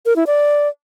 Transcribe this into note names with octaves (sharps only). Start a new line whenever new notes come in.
A#4
E4
D5